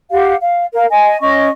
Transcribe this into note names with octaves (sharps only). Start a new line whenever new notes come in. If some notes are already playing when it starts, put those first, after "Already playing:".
G4 F5 F#5
F5
A#4 F5
D#5 G#5
C#4 D#5 C#6